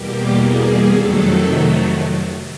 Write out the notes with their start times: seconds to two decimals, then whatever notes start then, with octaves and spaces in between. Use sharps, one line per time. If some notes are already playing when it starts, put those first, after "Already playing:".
Already playing: E2 B2 G3 A#3 G4
0.36 G#4
0.87 F2 C3 D#3 F#3 A3 A4